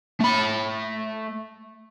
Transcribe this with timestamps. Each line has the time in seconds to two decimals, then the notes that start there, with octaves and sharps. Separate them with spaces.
0.20 A3 B5